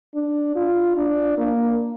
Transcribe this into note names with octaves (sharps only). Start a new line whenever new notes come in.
D4
F4
D4
A#3